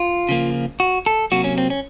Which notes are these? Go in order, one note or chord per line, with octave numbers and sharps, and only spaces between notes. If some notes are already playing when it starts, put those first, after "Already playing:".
Already playing: F4
C#3 F3 A#3
F#4
A4
C3 F#3 A#3 F#4
C#4
C4
C#4